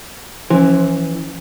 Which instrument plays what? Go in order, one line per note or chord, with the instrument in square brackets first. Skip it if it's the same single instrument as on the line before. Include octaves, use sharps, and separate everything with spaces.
[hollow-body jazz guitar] E3 [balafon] F3 C#4